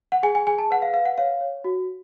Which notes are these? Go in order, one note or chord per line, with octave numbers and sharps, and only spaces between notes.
F#5
G#4 G#5
G#5
G#4 G#5
A5
B4 F#5
F5
B4 F5
F#5
C#5 F5
C#5
F#4